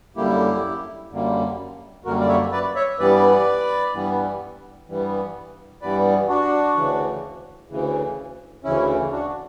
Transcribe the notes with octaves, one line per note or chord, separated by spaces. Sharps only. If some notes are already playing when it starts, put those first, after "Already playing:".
F#2 D3 G3 A#3 E4 G4
F#2 D3 G3 A#3
F#2 D3 G3 A#3 F#4 A#4
D5
C#5 E5
B4 D5
C#5 E5
G2 E3 G3 B3 B4 D5
G2 E3 G3 B3
G2 E3 G3 B3
G2 E3 G3 B3 B4 D5
D4 F#4
D2 C#3 E3
D2 C#3 E3
D2 C#3 E3 C#4 E4
D4 F#4